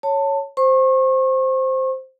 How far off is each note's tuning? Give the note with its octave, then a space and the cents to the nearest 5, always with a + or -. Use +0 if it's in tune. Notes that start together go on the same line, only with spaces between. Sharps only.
C#5 +0 A5 +20
C5 +0 C#6 -35